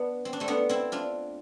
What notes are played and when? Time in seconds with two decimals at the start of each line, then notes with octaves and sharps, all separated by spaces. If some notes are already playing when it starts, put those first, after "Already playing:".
Already playing: B3 D4
0.25 C4
0.33 D4
0.40 A3 C4
0.48 B3 D4
0.69 C4 E4
0.92 D4 F4